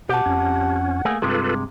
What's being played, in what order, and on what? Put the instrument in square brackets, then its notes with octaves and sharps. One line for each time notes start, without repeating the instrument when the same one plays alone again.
[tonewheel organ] B2 [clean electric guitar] G4 A5 [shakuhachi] F#5
[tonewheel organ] F2 C#4
[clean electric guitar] A3 A#3 G#4
[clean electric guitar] G2 C3 G#3 [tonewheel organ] F4 A4 B4